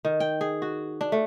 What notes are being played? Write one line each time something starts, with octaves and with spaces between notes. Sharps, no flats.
D#3
G5
G#4
F#4
D4
A3